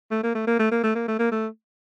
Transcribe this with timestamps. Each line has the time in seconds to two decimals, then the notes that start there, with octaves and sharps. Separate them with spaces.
0.11 A3
0.23 A#3
0.35 A3
0.47 A#3
0.59 A3
0.72 A#3
0.84 A3
0.95 A#3
1.08 A3
1.19 A#3
1.32 A3